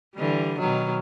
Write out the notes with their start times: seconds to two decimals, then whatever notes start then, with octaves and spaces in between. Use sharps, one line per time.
0.16 D3 E3 G3
0.59 B2 D#3 F#3